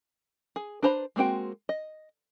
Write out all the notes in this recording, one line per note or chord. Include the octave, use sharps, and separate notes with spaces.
G#4
D4 B4 C5 A#5 B5
G#3 A#3 C4 F#4 G5
D#5